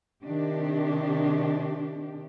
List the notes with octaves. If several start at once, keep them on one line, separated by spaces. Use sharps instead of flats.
C3 D#3 D4 G4